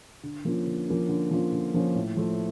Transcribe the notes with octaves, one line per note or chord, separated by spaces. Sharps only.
D3
F3 A#3 C#4 F4
D3
F3 A#3 C#4 F4
D3
F3 A#3 C#4 F4
D3
F3 A#3 C#4 F4
A2
F3 A3